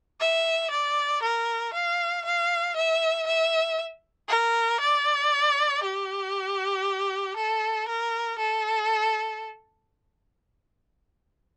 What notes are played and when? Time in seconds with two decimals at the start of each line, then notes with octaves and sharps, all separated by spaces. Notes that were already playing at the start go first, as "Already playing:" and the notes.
0.21 E5
0.71 D5
1.23 A#4
1.74 F5
2.25 F5
2.76 E5
3.27 E5
4.29 A#4
4.80 D5
5.83 G4
7.36 A4
7.88 A#4
8.38 A4